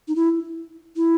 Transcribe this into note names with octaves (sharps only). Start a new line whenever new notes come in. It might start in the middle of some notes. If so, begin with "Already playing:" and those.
D#4
E4
E4